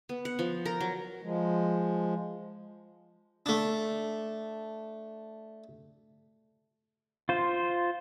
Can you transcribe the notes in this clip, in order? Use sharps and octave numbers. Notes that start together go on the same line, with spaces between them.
B3
F#5
F3
A#4
F#3
F3 G#3
A3 D4
F4 C5